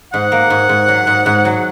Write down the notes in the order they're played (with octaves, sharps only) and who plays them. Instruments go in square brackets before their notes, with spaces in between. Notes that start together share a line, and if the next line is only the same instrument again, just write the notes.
[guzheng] G#2 [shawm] F#5
[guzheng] A#3
G#2
G#2
F#3
G#2
G#2
F#3